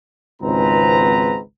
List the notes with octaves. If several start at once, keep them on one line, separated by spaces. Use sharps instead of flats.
G#1 C#2 G#2 C4 B4 A#5